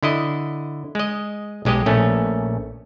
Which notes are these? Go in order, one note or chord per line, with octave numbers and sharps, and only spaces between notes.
D3 E4 D#5
G#3 D#5
B1 G#3 G4 D#5
A#1 A3 C#4